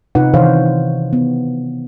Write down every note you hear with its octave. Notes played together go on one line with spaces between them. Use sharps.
C3 D#4 F4 B4 F#5
C3 D#3 E3 C5 C#5 F5
B3